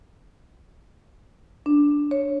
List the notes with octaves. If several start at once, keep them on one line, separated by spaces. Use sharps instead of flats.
D4
C#5